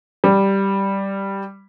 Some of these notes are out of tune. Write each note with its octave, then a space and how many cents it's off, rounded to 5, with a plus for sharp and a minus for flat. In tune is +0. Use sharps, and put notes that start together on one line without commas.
G3 +0